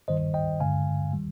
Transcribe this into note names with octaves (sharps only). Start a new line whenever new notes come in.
G2 D#3 G3 C5 D#5
D#5 G5
G2 D3 G#3 F5 G#5
D#3 G3